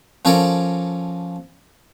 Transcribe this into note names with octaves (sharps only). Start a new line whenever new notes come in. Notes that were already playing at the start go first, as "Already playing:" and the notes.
F3 C#4 A4 A#4 C#5 D5